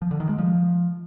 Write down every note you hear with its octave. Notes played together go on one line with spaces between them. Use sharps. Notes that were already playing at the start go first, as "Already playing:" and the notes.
F3
D3
D#3
G#3
F3